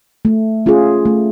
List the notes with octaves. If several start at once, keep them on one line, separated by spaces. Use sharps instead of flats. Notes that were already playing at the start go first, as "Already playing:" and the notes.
A3
C#4 F4 G#4
A3